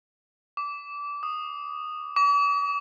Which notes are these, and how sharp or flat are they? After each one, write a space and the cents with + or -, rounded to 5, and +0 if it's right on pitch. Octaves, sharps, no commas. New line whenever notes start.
D6 -20
D#6 -15
D6 -45